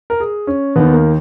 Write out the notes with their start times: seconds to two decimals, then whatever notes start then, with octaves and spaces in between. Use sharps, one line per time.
0.10 A#4
0.20 G#4
0.47 C#4
0.76 D#2 D#3 B3
0.94 A#3